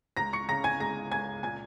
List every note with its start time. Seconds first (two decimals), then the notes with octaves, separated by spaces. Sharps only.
0.17 C#2 A#5 A#6
0.33 C#6 C#7
0.48 C#3 A#5 A#6
0.64 G#5 G#6
0.80 G#3 A#5 A#6
1.11 C#2 G#5 G#6
1.43 A#2 G#5 G#6